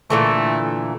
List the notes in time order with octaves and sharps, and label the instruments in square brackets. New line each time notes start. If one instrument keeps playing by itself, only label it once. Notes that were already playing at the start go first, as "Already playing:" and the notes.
[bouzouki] A#2 D3 E3 [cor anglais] A3